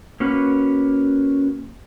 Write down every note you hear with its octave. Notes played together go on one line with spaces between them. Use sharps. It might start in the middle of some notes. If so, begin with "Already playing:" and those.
A#3 C#4 F#4 B4